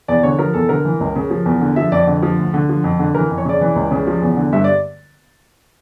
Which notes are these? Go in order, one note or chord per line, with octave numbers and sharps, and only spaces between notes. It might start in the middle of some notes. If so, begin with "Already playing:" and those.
E2 D5
D3 C#5
F3 A#4
E2 A4
D3 A#4
E3
C#2
C#3
F3
E2
D3
F3 E5
F2 D5
D3
F3
D2
D3
F3
F2
D3
E3 A#4
F2
C#5
C#3 D5
E3
C#2
C#3
F3
E2
D3
G2 E5
D5